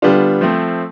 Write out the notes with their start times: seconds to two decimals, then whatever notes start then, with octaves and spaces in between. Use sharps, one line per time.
0.02 D3 G3 B3 D4 F4
0.41 F3 A3 C4